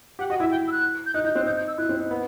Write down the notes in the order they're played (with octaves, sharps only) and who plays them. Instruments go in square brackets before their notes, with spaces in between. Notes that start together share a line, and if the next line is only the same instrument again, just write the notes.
[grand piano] G4 [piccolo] F#5
[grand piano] F#4 [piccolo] D#5
[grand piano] E4 [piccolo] E5
[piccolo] G5
E6
F#6
G6
[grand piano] D#4 [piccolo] F#6
[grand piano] D#4 [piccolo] G6
[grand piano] C4 [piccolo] F#6
[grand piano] D#4 [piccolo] G6
[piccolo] G6
E6
[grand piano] E4 [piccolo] F#6
[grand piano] C4
D#4
B3